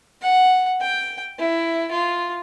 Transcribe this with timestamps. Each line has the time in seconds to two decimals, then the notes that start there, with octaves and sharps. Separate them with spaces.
0.22 F#5
0.81 G5
1.39 E4
1.92 F4